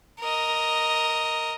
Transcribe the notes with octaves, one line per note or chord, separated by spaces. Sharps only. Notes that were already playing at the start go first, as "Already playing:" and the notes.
A#4 D#5